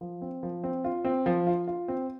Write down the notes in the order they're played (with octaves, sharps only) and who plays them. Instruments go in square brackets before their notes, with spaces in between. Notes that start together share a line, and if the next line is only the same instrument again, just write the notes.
[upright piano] F3
C4
F3
C4
F4
C4
F3
F4
F4
C4